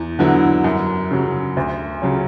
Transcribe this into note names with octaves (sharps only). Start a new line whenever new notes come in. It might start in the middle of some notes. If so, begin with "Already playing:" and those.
Already playing: E2
D3 F#3 B3 E4
F#2
C#3 F#3
D2
C#3 F#3 C#4